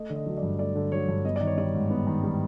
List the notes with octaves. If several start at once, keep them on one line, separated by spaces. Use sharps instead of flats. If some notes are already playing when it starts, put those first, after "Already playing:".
Already playing: A3 D#5
D3
D#5
F#3
D5
G2
A3 D5
D3
F#3 C#5
G2
B3 D#5
D#3 D5
C#5
G3 D5
G#2
B3
D#3
G3